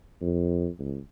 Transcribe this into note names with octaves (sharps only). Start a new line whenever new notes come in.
F2
C#2